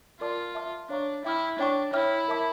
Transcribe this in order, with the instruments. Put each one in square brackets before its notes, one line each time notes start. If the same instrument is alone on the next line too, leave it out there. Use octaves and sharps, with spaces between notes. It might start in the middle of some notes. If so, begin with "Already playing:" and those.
[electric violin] F4 [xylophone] A#4 D5 A5 D6
[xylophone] E5 A5 D6 F6
[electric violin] D4 [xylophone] C#5 F5 A#5 C#6
[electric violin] E4 [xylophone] E5 G5 D6 F6
[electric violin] D4 [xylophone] C#5 G5 C#6
[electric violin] E4 [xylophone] C#5 E5 G5 D6 F6
[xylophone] A#4 E5 A5 D6